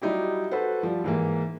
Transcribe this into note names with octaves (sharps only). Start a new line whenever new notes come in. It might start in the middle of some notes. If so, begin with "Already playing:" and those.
F#3 G3 D#4 E4 G4
F#4 A4 B4 C5 F#5
F3 G3
G#2 E3 A#3